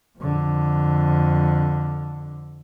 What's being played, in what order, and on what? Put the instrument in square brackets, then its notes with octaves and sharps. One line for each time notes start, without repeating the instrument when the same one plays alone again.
[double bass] F2 D3